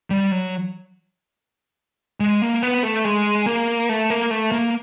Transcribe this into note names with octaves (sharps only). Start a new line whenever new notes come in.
G3
F#3
G#3
A#3
B3
A3
G#3
A#3
A3
A#3
A3
A#3